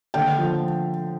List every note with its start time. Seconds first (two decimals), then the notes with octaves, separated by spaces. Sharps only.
0.14 D3 G5
0.38 F3